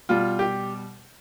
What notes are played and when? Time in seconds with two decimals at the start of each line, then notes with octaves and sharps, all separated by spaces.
0.09 B2 G3 F4
0.39 G4